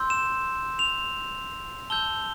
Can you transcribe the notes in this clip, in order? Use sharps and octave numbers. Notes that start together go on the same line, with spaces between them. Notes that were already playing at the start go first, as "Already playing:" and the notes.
Already playing: C6 E6 G6
E7
F7
A5 E6 G6 G7